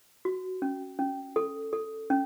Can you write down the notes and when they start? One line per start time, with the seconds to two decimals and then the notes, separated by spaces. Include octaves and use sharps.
0.25 F#4
0.62 C#4
0.99 C#4
1.36 A4
1.73 A4
2.10 C#4